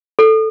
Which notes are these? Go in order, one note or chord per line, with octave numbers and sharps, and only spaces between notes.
A4